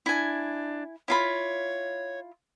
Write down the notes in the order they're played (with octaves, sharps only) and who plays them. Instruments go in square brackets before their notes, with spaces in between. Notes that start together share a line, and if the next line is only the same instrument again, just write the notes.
[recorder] D4 [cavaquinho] E4 G#5
[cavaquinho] E4 F4 B5 [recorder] C#5